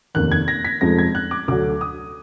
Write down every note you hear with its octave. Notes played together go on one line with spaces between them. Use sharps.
F1 D#2 D#3 F#6
G#6
A#6
B6
F1 F2 F3 G#3 A#6
G#6
F#6
D6
D2 D3 F#3 D6
D#6